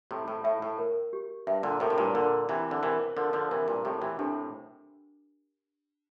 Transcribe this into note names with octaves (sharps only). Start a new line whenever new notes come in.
A2 C3 E4
A2
A2 E5
A2
A#4
G4
G2 E5
A#2 D3
A2 C3 A#4
C3
G2 A#2
A#2 D3 A#4
C3 E3 E4
D3
C3 E3 A#4
D3 F3 A#4
D3 F3
C3 E3 A#4
G2 A#2
A2 C3 G4
C3 E3
A2 C3 D4